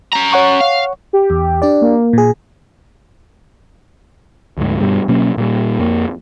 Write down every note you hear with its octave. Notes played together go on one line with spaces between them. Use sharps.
C#4 A#5
C#5 F#5 C#6
F5
G4
E2
D4 G4 D5
A#3
A#2 G#4
D2 G#2
G2 B2 G3
B2 F#3 A#3 C#4
A#2 G3
F2 A#3